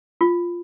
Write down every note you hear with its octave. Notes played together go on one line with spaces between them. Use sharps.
F4